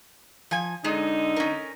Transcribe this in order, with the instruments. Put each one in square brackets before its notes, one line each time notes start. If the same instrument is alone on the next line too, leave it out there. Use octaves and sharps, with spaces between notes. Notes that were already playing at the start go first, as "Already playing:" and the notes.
[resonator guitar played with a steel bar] F3 G#5
[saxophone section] D3 D#4 [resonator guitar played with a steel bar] G#3 G#4
[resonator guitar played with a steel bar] C#4 A#4